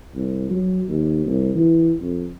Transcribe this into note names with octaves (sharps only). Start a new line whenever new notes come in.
C2
F#3
D#2
C2
E3
F2